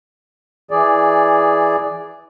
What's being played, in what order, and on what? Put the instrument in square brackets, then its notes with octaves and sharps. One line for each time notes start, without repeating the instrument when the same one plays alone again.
[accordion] E3 G#4 D5